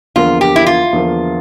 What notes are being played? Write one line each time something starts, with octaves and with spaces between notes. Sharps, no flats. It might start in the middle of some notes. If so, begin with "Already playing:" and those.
E2 D3 F3 A#3 F4
G4
E4
F4
E2 D3 F3 A#3